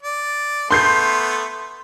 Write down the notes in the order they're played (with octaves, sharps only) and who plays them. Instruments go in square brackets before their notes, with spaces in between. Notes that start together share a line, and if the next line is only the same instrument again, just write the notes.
[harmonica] D5
[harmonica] A3 B3 [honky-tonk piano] C6 G6 C7